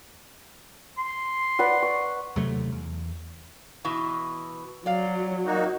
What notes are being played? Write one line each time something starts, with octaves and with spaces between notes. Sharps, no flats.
C6
B4 D5 F#5
C#6
D#2 C3 F#3 A3
E2
B2 E3
F#3 D5 F5
A#3 D#4 F#4